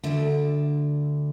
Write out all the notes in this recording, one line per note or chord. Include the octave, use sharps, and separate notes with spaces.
D2 D3 A3